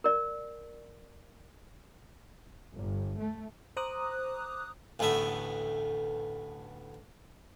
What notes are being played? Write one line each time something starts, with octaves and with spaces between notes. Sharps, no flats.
A#4 D5
G1
A3
C5 A#5 D6 D#6 F#6
A1 D2 A3 B3 E5